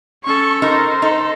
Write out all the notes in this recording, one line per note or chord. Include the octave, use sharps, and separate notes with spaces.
C#4 A4 C#6
D#4 A#4 C5
D#4 A4